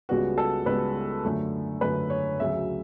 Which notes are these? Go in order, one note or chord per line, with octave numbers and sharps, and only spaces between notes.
C#2 C#3 G3 B3 F#4
A4
C#2 C#3 G3 B3 B4
F#2 D3 A3
F#2 D3 A3 B4
C#5
D2 C#3 F#3 E5